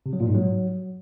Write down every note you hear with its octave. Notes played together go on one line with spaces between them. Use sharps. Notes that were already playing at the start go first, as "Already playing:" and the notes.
C3
F#3
A#2
G#2
F#3